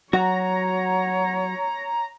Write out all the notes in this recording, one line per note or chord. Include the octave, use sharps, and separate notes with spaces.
F#3 F#4 C#5 A#5